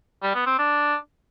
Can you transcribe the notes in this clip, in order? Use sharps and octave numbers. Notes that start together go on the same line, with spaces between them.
G3
B3
C4
D4